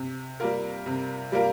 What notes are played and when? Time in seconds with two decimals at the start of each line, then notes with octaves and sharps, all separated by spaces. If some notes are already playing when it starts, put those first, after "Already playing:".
Already playing: C3
0.40 G3 A#3 F4 A#4
0.86 C3
1.32 G3 A#3 F4 A#4